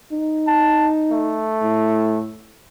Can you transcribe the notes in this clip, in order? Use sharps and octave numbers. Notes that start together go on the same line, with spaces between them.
D#4
A5
A3
A2